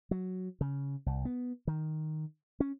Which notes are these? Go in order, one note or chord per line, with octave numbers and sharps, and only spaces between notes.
F#3
C#3
C2
B3
D#3
C#4